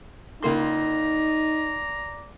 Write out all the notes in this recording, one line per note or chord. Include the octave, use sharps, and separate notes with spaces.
C#2 A#3 D#4 D5 A#5 C6